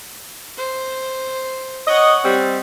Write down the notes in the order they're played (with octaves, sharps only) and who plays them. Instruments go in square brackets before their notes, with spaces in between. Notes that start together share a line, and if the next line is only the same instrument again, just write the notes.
[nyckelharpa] C5
[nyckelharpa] C#5 F#5 [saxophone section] D#5
[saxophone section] G3 C4